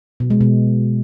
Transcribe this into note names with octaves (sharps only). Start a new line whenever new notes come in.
B2
G#3
B2